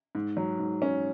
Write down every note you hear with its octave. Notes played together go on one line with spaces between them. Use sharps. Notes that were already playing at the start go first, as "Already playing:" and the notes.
G#2
F#3
G#2
C#4